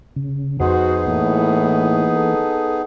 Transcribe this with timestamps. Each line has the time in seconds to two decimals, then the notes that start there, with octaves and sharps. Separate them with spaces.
0.16 C#3
0.60 F2 B3 D#4 F#4 G#4 C5
1.07 A2 E3 A#3
2.15 A4